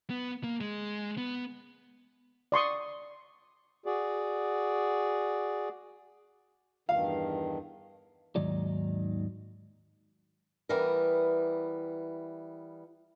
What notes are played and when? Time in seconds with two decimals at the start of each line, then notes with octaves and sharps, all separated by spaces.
0.10 B3
0.44 A#3
0.61 G#3
1.18 B3
2.52 D5 C6 C#6 D#6
3.86 F#4 G#4 D5
6.89 E2 G2 D#3 F5
8.36 D#2 G#2 D#3 F#3 D#4 D5
10.69 E3 G3 B3 A#4